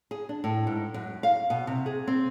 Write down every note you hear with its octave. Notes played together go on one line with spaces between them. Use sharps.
G#4
D4
A2
G#2
F#2
F5
B2
C3
G#4
C4